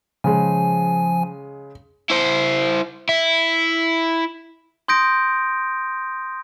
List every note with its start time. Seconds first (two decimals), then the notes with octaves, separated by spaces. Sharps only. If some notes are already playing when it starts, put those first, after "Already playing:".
0.24 C#3 F3 G#3 G#5
2.10 E4 C5
3.09 E4
4.88 C6 D#6 G6 A#6 D7